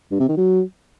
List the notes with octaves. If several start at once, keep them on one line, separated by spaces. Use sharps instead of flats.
G2
C3
D#3
F#3